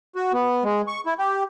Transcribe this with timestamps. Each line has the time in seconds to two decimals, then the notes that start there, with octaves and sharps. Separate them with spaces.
0.15 F#4
0.33 B3
0.64 G#3
0.88 C#6
1.06 E4
1.19 G4